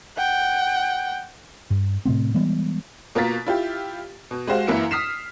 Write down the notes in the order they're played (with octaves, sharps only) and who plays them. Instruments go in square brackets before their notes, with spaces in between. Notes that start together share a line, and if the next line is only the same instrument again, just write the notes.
[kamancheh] F#5 G5
[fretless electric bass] G2
A2 C3 A3 C4
E3 G3 G#3 B3
[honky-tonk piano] B2 A#3 F4 A#5 A6 B6
E4 F4 G4
B2
G#3 F#4 G4 C5 F5
F#2 E3 A#3 E4 C#7
D#6 F6 B6 C7 E7